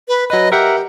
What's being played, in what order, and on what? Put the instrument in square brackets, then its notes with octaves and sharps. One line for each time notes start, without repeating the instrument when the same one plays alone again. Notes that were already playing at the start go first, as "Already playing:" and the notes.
[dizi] B4
[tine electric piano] F#3 B4 [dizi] D#5
[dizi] G4 [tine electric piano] A#4 E5 F#5